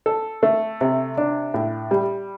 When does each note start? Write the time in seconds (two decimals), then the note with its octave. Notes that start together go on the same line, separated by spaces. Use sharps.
0.06 A4
0.43 A3
0.81 C3
1.17 D4
1.54 A2
1.91 G3